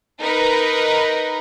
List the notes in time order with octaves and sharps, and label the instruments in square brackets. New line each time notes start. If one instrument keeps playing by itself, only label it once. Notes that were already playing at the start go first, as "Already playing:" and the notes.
[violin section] D#4 A#4 B4